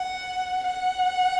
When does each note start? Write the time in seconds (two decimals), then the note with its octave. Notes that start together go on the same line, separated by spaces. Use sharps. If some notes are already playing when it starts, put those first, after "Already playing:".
Already playing: F#5
0.63 F#5